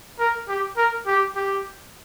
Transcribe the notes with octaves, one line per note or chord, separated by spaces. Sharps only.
A#4
G4
A#4
G4
G4